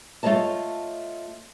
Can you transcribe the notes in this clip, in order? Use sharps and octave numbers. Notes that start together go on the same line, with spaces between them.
A3 F4 C#5 D#5 A5